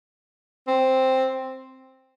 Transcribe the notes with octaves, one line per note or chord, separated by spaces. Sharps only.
C4